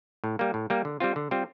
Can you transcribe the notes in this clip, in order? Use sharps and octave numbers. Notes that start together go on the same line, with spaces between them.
A2
G3 A#3
A2
G3 A#3
D3
G3 C4 F4
D3
G3 C4 F4